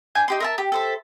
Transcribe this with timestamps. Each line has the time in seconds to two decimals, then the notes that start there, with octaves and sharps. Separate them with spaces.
0.15 D4 G#5 G6
0.28 D#4 G4 C6
0.40 A#4 E5 A5
0.58 G4
0.72 A4 C5 E5